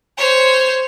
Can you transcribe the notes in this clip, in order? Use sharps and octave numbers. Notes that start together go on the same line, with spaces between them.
C5 C#5